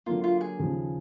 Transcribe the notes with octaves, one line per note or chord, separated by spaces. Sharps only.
D3 F#3 A#3 F4
F4
G#4
D#2 C#3 F3